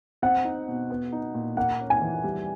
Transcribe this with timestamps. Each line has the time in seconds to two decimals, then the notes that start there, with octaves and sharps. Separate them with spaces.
0.22 C4 F#5
0.44 D#4
0.68 B2
0.90 B3
1.12 D#4
1.35 A#2
1.57 A#3 F#5
1.80 C#4
1.90 G#5
2.01 E3
2.24 G3